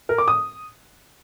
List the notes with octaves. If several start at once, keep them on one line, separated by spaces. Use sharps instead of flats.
A#4
D6
D#6